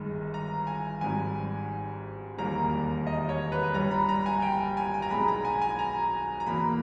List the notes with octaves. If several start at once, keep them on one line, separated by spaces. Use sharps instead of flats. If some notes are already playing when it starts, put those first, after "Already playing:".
Already playing: G1 G2 D#3 G#3
A#5
G#5
G#1 G#2 G3 G#5
E1 D#2 D#3 G3 A#3 A#5
D#5
C#5
B4
G1 G2 G3 A#5
B5
A#5
G#5
G5
G#5
G#5
A#5
B1 B2 G#3 B3 B5
A#5
G#5
G#5
A#5
A#5
E2 B2 A#3 B5